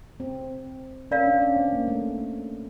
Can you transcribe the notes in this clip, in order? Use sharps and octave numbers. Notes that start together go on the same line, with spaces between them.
C4
C#4 A#4 D5 F5
D4
C#4
C4
A#3
A3